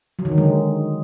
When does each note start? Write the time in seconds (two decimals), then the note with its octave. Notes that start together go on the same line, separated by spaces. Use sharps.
0.19 F#3
0.25 D#3
0.31 D3
0.38 G#3